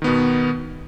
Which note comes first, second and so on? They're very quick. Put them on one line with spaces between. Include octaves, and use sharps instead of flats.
D#3 B3 B2